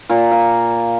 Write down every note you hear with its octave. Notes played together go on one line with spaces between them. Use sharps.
A#2
F5